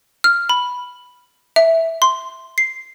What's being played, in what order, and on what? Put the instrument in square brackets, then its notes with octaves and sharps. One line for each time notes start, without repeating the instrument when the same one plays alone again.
[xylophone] F6
B5
E5
C6
C7